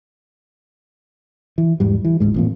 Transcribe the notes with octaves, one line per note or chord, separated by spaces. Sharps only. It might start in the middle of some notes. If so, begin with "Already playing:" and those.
E3
E2 G#2 G3
E3
G1 D2 G#2 G#3
A1 F2 A#2